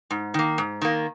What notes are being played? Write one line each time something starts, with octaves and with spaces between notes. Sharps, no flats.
G#2
D#3 A#3
G#2
D#3 A#3